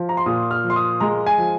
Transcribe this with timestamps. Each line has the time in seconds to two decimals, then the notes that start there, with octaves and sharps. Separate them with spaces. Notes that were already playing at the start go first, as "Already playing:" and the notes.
Already playing: F3
0.09 A#5
0.17 C6
0.26 A#2 D#6
0.51 F6
0.64 F3
0.70 C6
0.76 D#6
1.00 G#3 A#5
1.27 G#5
1.38 F3